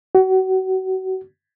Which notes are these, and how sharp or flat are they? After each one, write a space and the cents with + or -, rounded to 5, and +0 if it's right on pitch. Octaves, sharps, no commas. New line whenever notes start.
F#4 +30